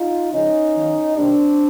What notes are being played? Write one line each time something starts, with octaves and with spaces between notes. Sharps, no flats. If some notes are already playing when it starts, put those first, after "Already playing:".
Already playing: D#4 F4
C#3 F3 G#3 C#4 D#4
D#3 F#3 A#3
C3 D#3 G3 A#3 C4 D4